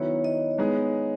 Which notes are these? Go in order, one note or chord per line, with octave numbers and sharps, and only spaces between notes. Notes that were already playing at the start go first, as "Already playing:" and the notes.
Already playing: D#3 F#3 B3 E4 C#5
D#5
G#3 B3 D#4 G#4